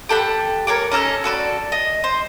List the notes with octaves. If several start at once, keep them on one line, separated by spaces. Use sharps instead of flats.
G4 A4 F#5 B5
A#4 C#5 F#5 D6
C#4 D#4 A4 F6
F#4 A4 B4 D5
D#5
C5